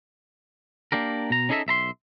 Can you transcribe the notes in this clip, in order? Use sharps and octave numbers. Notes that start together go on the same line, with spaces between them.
A#3 D4 G4 A#4
B2 A#5
C#4 D#4 G#4 A4 D#5 E5
B1 E5 A#5 C6